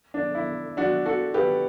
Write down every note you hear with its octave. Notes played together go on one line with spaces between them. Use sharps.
D4
E4
D4 F#4
F#4 A4
G4 B4